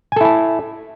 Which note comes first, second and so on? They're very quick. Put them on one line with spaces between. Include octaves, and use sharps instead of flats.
G#5 A4 E4 A5